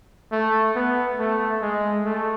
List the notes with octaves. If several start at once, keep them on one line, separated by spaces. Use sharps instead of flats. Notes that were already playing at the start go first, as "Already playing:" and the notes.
A3
B3
A3
G#3
A3